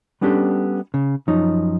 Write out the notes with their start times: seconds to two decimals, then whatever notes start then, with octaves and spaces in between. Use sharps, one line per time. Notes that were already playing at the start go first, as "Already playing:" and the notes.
0.21 G3 B3 C#4 D4 G4 A4
0.94 C#3
1.28 F#2 F3 D#4 C#5